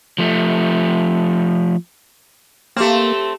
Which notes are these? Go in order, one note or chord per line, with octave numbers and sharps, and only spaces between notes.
F3 A3
A3 A#3 C4 G4 E7